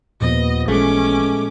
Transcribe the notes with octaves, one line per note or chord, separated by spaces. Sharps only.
D#2 A#2 F3 B3 D#5
A1 G#3 A3 C#4 D6